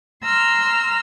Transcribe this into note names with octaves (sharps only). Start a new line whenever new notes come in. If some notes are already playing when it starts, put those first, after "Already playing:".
A#5 C6 E6 F6